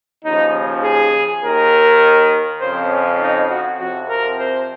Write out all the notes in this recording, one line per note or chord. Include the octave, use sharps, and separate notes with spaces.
D#2 C#3 F3 D#4
G#4
D#2 D#3 A#4
F2 C#3 F3 C5
C#4
D#4
F#4
F2 C3 F3 F#4
A#4
C5